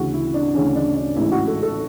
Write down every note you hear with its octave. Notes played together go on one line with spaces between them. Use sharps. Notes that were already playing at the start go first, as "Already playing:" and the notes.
Already playing: D2 C#3 E3 F#4
E4
D4
D2 C#3 E3 C#4
D4
D4
A1 G#2 E3 E4
F#4
A4
A4